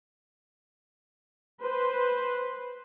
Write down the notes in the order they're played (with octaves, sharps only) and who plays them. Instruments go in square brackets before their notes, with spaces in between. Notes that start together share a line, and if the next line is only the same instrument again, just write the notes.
[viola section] B4 C5